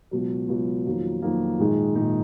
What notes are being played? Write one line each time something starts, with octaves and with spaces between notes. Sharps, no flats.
C#2 B2 F#3
C#2 B2 F#3
F2 D#3 F#3 A#3
F2 D#3 F#3 A#3
A#1 G#2 D#3 G#3 D#4
A#1 G#2 D#3 G#3 D#4